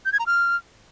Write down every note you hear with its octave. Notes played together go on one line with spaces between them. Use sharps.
G6
G#6
A#5
F6